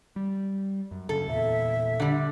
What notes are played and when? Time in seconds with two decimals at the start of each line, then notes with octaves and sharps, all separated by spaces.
0.16 G3
0.91 F#2
1.09 F#2 C#3 A4
1.28 E2 A#2 E5
2.00 D3 G3